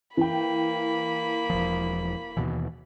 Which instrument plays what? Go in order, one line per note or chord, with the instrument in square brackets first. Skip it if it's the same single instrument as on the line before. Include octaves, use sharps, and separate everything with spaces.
[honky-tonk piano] E3 G5 [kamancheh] A#3 B5
[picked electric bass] E1 F3
D#2 B2 E3